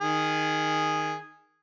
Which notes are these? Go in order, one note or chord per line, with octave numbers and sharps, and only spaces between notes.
D#3 G#4